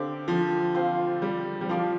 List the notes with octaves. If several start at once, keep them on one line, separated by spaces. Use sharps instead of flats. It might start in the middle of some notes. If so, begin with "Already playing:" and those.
Already playing: D3 C4 G4 D5 F5
F3
C4 F4 C5 F5
G3
G3
F3 D4 F4 D5 F5